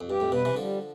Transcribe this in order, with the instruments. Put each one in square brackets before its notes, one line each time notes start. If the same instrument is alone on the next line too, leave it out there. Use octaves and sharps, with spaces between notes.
[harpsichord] F2
[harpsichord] G2 [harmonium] G4
[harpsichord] F2 A2
[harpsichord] G2 B2 [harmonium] B4
[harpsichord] C3 E3
[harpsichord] D3 F3 [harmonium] G3